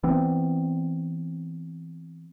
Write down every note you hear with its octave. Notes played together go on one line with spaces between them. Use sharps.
E3 B3 C4